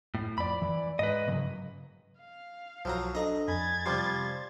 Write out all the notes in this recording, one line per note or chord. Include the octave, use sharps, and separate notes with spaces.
A2
F2 D5 B5
E3
G#2 B4 D#5
G2 C#3 F#3
F5
B1 F3 F#3 A#5
D4 A4 D#5 A#5
F2 G#5 B5 G#6 A6
C3 F3 G3 C6